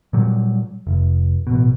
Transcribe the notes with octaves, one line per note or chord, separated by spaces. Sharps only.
A#2 F#3 G3
F1
A1 B2